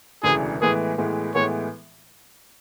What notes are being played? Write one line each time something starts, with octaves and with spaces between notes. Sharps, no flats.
E1 D2 C#3 E3 G#4
A2 E3 G#3 B3 G#4
A2 E3 G#3 B3
A2 E3 G#3 B3 C#5